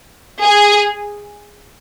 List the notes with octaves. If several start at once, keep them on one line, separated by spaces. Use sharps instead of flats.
G#4